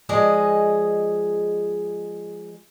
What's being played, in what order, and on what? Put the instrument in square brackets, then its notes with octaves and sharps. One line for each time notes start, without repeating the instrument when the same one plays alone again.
[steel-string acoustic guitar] F3 G#3 G#4 D5 D#5